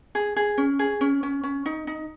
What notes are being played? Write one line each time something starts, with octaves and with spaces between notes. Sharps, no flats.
G#4
G#4
C#4
G#4
C#4
C#4
C#4
D#4
D#4